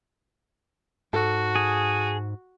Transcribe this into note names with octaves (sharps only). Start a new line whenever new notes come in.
G#2 F#4 A4
G#4